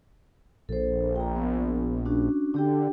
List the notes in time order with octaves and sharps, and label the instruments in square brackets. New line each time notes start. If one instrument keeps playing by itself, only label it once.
[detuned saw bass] A#1 [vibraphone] A4 C5
[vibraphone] G5 A#5
B3
C#4 D4 F#4
[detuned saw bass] D3 [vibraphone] D4 G4 G5